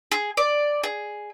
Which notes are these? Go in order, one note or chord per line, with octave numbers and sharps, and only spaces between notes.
G#4
D5
G#4